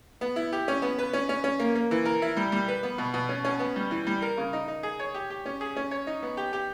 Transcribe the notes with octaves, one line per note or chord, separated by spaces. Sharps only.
B3
E4
G4
C#4
B3
B4
C#4
C#4
C#4
A#3
A#3
E3
A#4
E4
G3
G3
B4
B3
B2
B2
C#4
C#4
B3
G3
E3
G3
A#4
C#3
D#4
D#4
G#4
C#5
G4
G4
C#4
G#4
C#4
C#5
D#4
B3
G4
G4